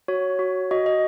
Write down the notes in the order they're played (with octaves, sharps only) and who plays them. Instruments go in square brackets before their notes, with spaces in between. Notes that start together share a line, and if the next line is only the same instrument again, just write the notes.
[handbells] F#4 C#5
F#4
F#4 D#5
D#5